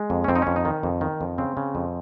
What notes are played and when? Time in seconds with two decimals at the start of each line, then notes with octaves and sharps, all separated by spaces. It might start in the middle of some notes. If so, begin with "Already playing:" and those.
Already playing: G#3
0.10 F2
0.24 C#4
0.28 F2 C4
0.36 D#4
0.42 F2 C#4
0.56 D#4
0.65 D#3
0.83 F2
1.01 D#3
1.21 F2
1.38 C#3 C4
1.57 C#3
1.75 F2